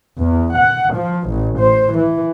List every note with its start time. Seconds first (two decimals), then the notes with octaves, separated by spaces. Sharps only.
0.19 E2
0.55 F#5
0.93 F3
1.27 A1
1.59 C5
1.94 E3